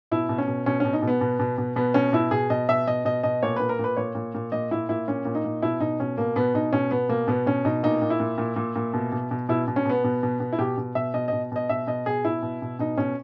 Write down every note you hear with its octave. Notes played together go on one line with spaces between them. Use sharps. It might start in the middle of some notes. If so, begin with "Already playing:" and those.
B2 E4
B2
C#4
B2
B2 C#4
B2 C#4
D#4
B2
B3
B2
B2
B2
B2 B3
B2 C#4
B2 E4
B2 G#4
B2 D#5
B2 E5
B2 D#5
B2 D#5
B2 D#5
A#2 C#5
A#2 B4
A#4
A#2 B4
A#2 C#5
A#2
A#2
A#2 D#5
A#2 E4
A#2 E4
A#2 C#4
A#2
D#4
A#2
B2 E4
B2 D#4
B2 C#4
B2 A#3
B2 B3
B2 D#4
B2 C#4
B2 B3
B2 A#3
B2 B3
B2 C#4
B2 D#4
A#2 D#4
A#2
E4
A#2
A#2
A#2
A#2
B2
B2
B2
B2 E4
B2
C#4
B2 B3
B2
B2
B2
E4
B2 G4
B2
B2 E5
B2 D#5
B2 D#5
B2 D#5
B2 E5
B2 D#5
B2 G#4
B2 E4
B2
B2
B2 D#4
B2 C#4